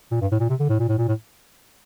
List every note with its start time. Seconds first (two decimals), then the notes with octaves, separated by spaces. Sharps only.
0.11 A#2
0.21 G2
0.31 A2
0.40 A#2
0.49 C3
0.60 D3
0.69 A2
0.79 A#2
0.89 A2
0.98 A#2
1.08 A2